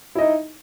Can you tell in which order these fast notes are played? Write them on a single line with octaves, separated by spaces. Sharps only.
E4 D#5 D#4